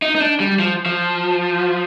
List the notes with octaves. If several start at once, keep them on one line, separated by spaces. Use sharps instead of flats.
D#4
D#4
D4
G3
F3
F3